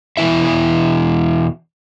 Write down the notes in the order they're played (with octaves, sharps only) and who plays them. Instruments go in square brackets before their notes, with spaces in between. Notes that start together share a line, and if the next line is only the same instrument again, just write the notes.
[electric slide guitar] E2 B2 E3 E4 E5